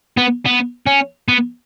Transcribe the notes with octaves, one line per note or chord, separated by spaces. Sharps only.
B3
B3
C#4
B3